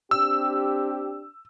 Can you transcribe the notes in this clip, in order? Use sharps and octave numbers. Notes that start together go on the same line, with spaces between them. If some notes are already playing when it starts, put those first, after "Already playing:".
C4 D4 G4 E6